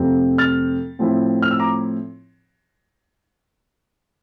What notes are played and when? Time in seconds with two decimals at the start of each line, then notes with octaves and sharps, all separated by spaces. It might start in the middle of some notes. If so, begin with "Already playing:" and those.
Already playing: F2 C3 F3 A3 C4
0.38 F6 A6
0.99 A2 F3 C4 E4
1.43 F6
1.51 E6
1.59 A#5 D6